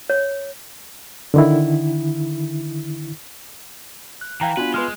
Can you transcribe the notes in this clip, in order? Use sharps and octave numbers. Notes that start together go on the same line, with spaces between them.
C#5
D3 D#3 E4
F#6
E3 F5 G5 A#5
B3 D4 F4 F#4 B4 G#5
G#3 B4 C6 F6